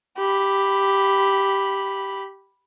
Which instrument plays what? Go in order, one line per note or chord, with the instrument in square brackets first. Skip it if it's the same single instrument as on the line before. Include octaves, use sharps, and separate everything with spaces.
[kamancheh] G4 B5